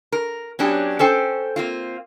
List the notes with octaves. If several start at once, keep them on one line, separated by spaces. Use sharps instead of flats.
A#4
F#3 B3 C#4 D4 G4
C#4 A4 C5 G5
A#3 C4 F4